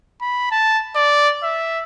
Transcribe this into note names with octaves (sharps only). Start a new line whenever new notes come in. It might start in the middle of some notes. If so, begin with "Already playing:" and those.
B5
A5
D5
E5